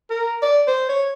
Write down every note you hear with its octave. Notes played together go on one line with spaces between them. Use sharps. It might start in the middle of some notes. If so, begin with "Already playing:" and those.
A#4
D5
C5
C#5